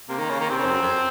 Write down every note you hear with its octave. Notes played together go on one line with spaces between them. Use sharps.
C3 A#3
D#3
C#3
D#3
C3 C4
C#3
F2
F#2
F2